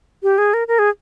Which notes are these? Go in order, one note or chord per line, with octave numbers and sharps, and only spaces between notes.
G4
G#4
A#4
A#4
G#4